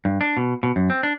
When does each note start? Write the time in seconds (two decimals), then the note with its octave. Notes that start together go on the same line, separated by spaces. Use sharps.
0.05 G2
0.21 D4
0.37 B2
0.63 B2
0.76 F#2
0.90 C4
1.03 D4